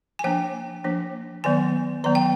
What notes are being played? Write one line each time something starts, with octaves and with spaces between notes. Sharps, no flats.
G#5
F3 A#3 D4 G5
F3 A#3 D4
D#3 F#3 B3 G#5
D#3 F#3 B3 A#5
G5